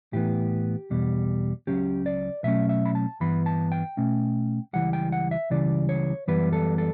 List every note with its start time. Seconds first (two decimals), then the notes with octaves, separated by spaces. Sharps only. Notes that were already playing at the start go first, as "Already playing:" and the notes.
0.13 A2 E3 B3 G4
0.91 E2 B2 G3
1.67 C#2 C#3 F#3 C#4 G4
2.06 D5
2.43 B2 F#3 A3 C#4 E5
2.69 E5
2.86 B5
2.95 A5
3.20 G2 E3 B3 B5
3.46 A5
3.72 G5
3.97 B2 A3 C#4
4.73 C#2 C#3 E3 G3 F#5
4.93 G5
5.12 F#5
5.31 E5
5.50 C#2 C#3 E3 G3 D5
5.89 C#5
6.27 F#2 E3 G3 B3 B4
6.53 A4
6.78 A4